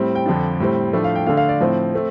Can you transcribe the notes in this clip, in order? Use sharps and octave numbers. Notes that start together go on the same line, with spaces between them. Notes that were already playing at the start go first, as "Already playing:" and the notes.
Already playing: A2 G3 C4
G5
F2 D3 F3 D4
A2 G3 C4
A2 F3 A3 D4
F5
G5
D3 A3 D4 F5
F5
D5
A2 F3 C4
A3 C4